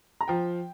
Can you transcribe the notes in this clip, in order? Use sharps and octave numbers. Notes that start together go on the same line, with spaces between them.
A#5
F3 G5